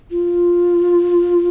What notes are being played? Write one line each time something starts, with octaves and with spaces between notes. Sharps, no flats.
F4